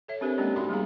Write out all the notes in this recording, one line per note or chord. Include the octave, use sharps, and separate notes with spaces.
A4 C#5 E5
C4 D4 G4 A#4 C5 G#5
G#3 A#3 C#4 D4 G4 D5
D#4 F#4 E5 B5 C6
G3 B3 G#4 F5 A#5